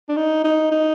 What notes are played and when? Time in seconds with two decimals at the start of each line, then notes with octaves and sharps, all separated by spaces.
0.09 D4
0.16 D#4
0.44 D#4
0.71 D#4